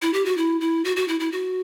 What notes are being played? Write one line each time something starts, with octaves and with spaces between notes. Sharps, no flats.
E4
G4
F#4
E4
E4
F#4
F#4
E4
E4
F#4